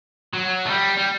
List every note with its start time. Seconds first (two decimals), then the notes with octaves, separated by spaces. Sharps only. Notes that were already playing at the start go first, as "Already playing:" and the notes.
0.33 F#3
0.66 A3
0.70 G3
0.97 G3